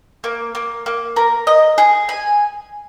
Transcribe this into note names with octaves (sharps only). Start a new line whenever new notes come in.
A#3
A#3
A#3
A#4
D#5
G#4
G#5